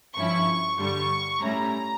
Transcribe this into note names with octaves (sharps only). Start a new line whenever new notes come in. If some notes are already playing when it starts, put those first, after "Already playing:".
G2 F3 C#4 E4 C#6
G2 D3 G3 C#6
A2 G3 C#4 E4 A#5